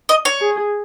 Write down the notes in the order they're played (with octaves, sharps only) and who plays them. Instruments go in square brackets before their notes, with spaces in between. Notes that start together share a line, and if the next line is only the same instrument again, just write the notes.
[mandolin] D#5
C#5
[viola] G#4